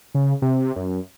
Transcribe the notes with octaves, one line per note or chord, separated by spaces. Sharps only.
C#3
C3
F#2